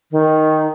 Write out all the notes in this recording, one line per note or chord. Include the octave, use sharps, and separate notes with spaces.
D#3